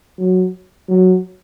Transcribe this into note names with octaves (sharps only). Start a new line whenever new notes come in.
F#3
F#3